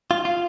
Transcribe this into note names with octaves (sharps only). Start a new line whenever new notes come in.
F4
F4